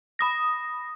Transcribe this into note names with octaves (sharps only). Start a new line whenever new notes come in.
B5 D#6 A#6